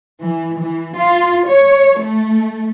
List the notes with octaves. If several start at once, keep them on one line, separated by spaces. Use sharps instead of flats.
E3
E3
F4
C#5
A3